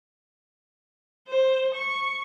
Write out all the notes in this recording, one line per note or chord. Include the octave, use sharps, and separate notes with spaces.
C5
C#6